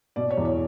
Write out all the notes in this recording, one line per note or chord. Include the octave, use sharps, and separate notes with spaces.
B2 D5
C#5
E2
C#5